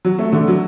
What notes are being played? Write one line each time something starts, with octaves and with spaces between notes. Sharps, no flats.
F#3
A3
D3
F#3